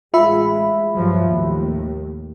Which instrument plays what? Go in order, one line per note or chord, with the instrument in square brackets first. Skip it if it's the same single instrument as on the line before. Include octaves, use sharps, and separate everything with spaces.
[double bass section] A1 G#3 [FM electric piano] F4 E5 B5
[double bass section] G2 F3 F#3
D#2 A2